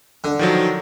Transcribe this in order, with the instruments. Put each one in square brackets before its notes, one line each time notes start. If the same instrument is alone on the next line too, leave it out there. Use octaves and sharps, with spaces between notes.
[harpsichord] D3
[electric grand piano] D#3 F3 F#3